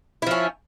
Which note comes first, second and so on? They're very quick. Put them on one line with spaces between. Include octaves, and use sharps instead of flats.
E4 F3 C#4